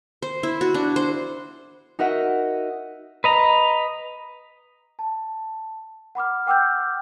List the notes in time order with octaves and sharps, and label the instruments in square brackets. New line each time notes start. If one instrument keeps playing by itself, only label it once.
[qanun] C5
E4
F#4
D4
C5
[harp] D#4 F#4 A#4 D#5 E5 F#5
[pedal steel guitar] B4 D#5 A#5
[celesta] A5
F#5 B5 D6 F6
F#5 G5 D6 E6 F6 G6